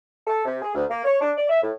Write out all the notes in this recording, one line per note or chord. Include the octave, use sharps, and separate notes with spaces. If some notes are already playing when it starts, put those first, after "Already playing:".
A4
C3
G#4
D2
A#3
C#5
D4
D5
E5
A2